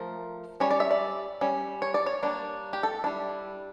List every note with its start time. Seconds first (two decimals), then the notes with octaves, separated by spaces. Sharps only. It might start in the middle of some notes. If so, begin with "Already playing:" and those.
Already playing: F3 A3 A#4
0.60 G3 C#4 C#5
0.71 D5
0.80 E5
0.91 D5
1.41 G3 C#4
1.82 C#5
1.94 D5
2.06 C#5
2.23 G3 A#3 D4
2.73 G4
2.83 A4
3.04 G3 D4 E4